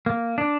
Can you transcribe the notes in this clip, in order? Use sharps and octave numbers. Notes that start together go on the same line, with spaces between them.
A#3
D4